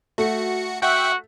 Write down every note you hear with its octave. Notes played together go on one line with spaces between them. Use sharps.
A3 F#4 C#7
F#4 E5 F#5 G5